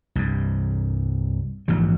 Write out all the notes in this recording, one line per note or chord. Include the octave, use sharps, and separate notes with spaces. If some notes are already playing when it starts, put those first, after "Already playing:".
C2 G2
A#1 G#2 E3 F#3